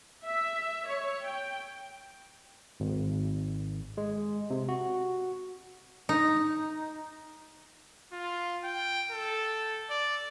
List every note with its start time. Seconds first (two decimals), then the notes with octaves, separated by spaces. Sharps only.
0.25 E5
0.87 C#5
1.23 G5
2.80 G#1
3.97 G#3
4.50 C3
4.69 F#4
6.09 D#4
8.13 F4
8.64 G5
9.11 A4
9.90 D5